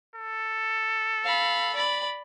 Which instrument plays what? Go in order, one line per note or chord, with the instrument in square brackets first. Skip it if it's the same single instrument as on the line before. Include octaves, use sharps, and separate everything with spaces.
[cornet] A4
[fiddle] F5 B5
D5 B5